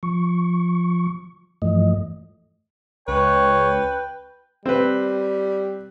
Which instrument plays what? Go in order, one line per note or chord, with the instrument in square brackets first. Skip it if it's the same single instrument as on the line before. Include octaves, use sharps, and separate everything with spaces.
[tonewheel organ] F3 C#6
G2 E3 F3 A3 D#5
[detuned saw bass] C#2 [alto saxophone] B4 [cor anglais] C#5 [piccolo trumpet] G5
[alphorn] G3 [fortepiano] C4 B4